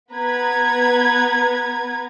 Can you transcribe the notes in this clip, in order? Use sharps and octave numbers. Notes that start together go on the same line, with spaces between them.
B3 B4 A#5 G#6